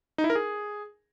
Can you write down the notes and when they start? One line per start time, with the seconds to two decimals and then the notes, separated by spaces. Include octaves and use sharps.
0.18 D#4
0.24 E4
0.30 A#4
0.35 G#4